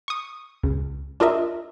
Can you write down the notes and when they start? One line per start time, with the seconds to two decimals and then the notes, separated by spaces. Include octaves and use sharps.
0.08 C#6 D#6
0.63 C#2
1.20 D4 F4 A#4 D#5 E5